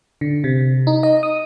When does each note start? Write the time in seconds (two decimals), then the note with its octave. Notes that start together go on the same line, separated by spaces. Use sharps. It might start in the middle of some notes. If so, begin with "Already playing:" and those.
0.21 D3
0.44 C3
0.87 D#4
1.03 D#5
1.23 D#6